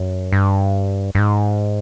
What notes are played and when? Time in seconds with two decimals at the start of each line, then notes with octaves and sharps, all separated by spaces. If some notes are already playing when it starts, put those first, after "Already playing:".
Already playing: F#2
0.32 G2
1.15 G2
1.19 G#2